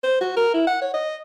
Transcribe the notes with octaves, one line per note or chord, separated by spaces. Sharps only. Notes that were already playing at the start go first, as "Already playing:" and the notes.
C5
F#4
A#4
E4
F#5
C#5
D#5